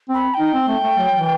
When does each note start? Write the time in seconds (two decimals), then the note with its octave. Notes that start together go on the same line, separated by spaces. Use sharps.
0.09 C4 B5
0.34 G5
0.39 D#4
0.54 C4
0.68 A3
0.83 A3
0.98 F#3
1.14 E3